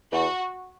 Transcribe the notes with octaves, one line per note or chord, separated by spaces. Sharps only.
E2 F#4